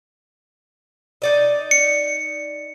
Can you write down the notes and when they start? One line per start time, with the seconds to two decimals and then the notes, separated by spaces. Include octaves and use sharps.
1.22 D#4 D5 D#5
1.71 C#7